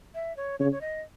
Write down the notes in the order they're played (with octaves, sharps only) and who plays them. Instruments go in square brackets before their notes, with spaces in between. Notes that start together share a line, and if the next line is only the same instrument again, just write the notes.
[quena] E5
C#5
[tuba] C#3 [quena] C#5
[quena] C#5
D#5